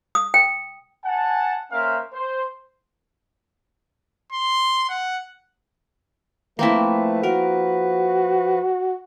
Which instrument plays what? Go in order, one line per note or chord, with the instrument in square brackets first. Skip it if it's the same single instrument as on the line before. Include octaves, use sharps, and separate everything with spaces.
[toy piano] D#6
G5
[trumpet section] F#5 G#5 A5
A#3 C#4 A#4 C5 E5 F5
C5
[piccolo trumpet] C6
F#5
[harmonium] F3 B4 [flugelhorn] A3 [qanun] A#3 C4 E4
[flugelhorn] F#4 [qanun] A#4